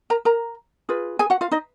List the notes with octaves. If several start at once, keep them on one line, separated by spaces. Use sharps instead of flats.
A#4 A#5
A#4 A#5
F4 G#4 B4
G#4 G#5
F#4 F#5
F4 F5
D#4 D#5